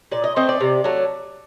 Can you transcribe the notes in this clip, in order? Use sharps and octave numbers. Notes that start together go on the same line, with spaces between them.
A#2 D5
D#5
A3 C4 D#5
D5
C3
F#3 A3